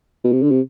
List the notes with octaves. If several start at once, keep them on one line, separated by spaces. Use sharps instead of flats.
B2
C3
D3
C3